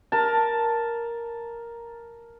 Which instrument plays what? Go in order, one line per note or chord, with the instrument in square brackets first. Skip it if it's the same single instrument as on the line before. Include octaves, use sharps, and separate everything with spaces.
[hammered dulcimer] A#4 A5